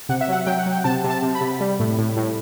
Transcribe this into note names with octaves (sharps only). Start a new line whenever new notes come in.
C3 F#5
E5
F#3 F#5
F#3 G5
F#5
F#3
G5
C3 A5
C3
A5
C3
B5
C3
G3
A2
A2
A2